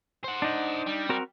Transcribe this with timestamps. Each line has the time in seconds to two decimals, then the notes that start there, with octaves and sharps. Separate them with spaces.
0.24 C5 F#5
0.42 D4 D#4
0.87 G3
1.09 C4 F#4 A#4